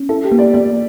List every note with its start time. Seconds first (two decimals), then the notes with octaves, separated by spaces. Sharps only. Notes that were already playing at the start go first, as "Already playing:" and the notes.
Already playing: C#4
0.09 E4 A4
0.24 G4
0.32 A#3
0.39 D5
0.54 A#3 D5